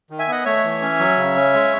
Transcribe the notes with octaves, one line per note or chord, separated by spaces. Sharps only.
D#3
E5 G#5
B3 D#5 F#5
A3 C#5 E5
E3
C#4
F#3
C#3
C#4
G#3